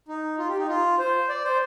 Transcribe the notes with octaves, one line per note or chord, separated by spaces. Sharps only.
D#4
F4
G4
D#4
F4
C5
D5
C5